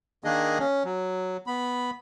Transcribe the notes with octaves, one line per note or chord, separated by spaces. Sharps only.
D#3 A#3 D4 G#4 D#5
C#4
F#3
B3 B5